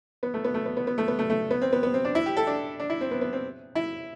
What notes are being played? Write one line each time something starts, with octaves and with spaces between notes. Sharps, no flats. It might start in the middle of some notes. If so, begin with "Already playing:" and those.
B3
A3
B3
A3
B3
B3
B3
A3
B3
A3
A3
B3
C4
B3
B3
C4
D4
E4
G4
A4
D4
D4
E4
C4
B3
B3
C4
E4